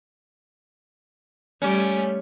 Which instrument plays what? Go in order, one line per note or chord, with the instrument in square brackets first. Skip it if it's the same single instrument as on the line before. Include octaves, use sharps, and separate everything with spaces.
[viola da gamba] G3 A3 [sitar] C#4